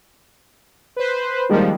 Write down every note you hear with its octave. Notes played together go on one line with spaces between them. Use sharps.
B4 C5
D#3 F3 G3 G#3 A#3